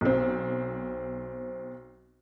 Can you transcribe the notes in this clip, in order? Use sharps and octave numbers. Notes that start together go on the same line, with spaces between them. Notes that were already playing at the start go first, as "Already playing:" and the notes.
B1 C4